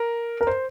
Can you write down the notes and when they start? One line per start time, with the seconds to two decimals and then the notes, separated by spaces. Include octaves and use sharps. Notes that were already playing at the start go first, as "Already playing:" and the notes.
Already playing: A#4
0.41 A#4
0.47 C5